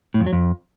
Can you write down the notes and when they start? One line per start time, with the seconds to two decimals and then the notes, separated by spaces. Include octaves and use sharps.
0.14 A2
0.20 F2
0.26 F#3
0.33 F2